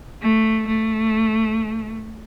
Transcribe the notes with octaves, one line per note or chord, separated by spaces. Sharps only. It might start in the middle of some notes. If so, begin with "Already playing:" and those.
A3
A3